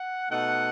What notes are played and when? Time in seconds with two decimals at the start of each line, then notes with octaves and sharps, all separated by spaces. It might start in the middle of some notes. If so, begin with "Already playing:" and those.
Already playing: F#5
0.30 B2 A3 D#4 F#5